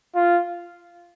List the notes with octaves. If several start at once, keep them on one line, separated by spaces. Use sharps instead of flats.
F4